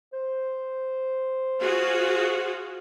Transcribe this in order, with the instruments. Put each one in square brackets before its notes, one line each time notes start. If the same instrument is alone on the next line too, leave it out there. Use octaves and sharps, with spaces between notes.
[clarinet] C5
[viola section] F4 F#4 G#4